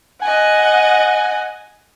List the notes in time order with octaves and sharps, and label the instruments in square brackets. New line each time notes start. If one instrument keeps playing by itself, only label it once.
[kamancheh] D#5 F#5 [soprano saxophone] G#5